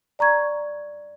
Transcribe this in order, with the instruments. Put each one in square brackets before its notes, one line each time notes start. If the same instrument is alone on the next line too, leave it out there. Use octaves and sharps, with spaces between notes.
[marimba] D5 A#5 C#6 G#6